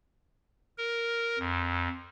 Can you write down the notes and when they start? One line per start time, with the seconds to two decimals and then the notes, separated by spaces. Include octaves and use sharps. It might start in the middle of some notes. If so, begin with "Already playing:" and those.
0.78 A#4
1.39 F2